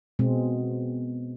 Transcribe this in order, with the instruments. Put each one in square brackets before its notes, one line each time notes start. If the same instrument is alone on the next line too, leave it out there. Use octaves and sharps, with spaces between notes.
[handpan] B2 G#3 C4